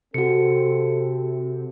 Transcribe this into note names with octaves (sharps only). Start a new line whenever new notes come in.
C3 C4 F#4 A4 C#7